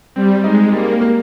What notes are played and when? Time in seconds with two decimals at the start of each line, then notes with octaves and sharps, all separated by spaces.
0.15 G3 C4
0.44 G#3 D#4
0.72 G3 A#3
1.01 A#3